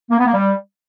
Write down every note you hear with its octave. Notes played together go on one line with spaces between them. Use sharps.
A#3
B3
A#3
G3